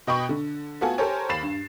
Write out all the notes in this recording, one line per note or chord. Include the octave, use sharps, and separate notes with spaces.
B2 D#5 G5 B5 C#6
D3
A3 B3 F4 F#4 A4 G#5
G4 A4 A#4 C5 C#5 G#5
D#2 B5 A6 C7 E7
G2